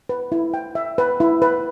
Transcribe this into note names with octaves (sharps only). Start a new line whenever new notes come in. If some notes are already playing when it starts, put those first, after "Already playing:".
B4
E4
G5
E5
B4
E4
B4